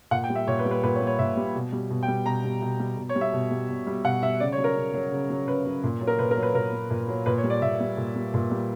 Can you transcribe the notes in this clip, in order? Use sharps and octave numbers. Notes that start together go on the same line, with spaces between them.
A#2 F#5
G5
G3
E5
A#2 C#5
B4
G3
B4
A#2 B4
C#5
G3
C#5
A#2 E5
G3
B2
G3
B2
G5
G3
B2 A#5
G3
B2
G3
B2
C#5
G3
E5
B2
G3
B2
G3
B2 F#5
G3 E5
C#3 D5
C#5
F#3
A#4
C#3
F#3
C#3
F#3
C#3 B4
F#3
A#2
F#3
A#4
A#2 B4
A#4
F#3
B4
A#2 A#4
F#3
A#2
F#3
A#2 B4
C#5
G3
D5
A#2 E5
G3
A#2
G3
A#2
G3